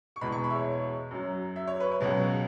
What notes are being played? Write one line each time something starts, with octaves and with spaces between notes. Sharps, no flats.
C#6
E2 B2 G#3 B5
C#6
B5
E5
C#5
F#2 F#3
E5
C#5
B4
C#5
C#2 B2 F#3